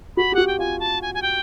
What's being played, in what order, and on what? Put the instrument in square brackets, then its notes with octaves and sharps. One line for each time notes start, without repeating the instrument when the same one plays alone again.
[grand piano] F#4 [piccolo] B5
[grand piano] G4
[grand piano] F#4 [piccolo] F#5
[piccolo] G5
[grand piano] F4 [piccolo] G#5
[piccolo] A5
G#5
G#5
G5